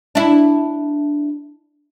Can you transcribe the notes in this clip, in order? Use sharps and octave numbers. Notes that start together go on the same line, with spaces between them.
D4 E4